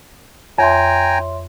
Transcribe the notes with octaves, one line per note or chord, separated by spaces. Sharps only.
F2 C#5 E5 G5 G#5 A#5 C6